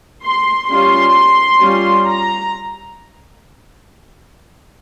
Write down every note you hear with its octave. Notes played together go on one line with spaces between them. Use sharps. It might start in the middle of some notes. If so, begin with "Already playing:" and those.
C6
G3 C#4 F4 C6
G3 C#4 F4
A#5